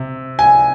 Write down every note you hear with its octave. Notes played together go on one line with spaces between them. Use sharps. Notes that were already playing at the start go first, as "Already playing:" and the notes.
Already playing: C3
G#5